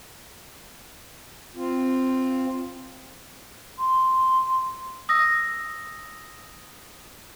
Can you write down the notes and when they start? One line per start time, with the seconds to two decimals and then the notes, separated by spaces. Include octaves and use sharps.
1.56 C4 F4
3.78 C6
5.09 D#6 E6 A#6